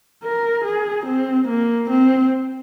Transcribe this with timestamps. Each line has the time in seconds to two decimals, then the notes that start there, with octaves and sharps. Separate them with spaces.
0.23 A#4
0.65 G#4
1.06 C4
1.48 A#3
1.90 C4